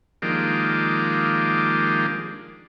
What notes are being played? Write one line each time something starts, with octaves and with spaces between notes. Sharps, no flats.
D#3 F3 G#3 A#3 D4 G4